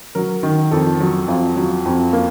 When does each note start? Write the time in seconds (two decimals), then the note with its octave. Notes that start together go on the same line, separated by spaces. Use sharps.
0.15 F#3 A#4
0.43 D#3
0.71 F2 A4
1.00 F#3
1.28 F2 F4
1.56 F#3
1.85 F2
2.13 A#3